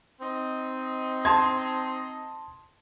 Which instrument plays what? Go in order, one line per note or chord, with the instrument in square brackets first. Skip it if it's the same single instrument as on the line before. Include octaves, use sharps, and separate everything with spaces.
[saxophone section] C4 D#4 D#5
[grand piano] A5 C6 G#6